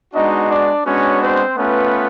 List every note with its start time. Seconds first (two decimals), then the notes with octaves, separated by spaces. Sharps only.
0.14 G#3 B3 D4 D#4 F#4 D#5
0.50 D4 D5
0.86 G#3 B3 C#4 D4 F#4 C#5
1.22 C4 C5
1.57 A3 B3 C#4 F4 B4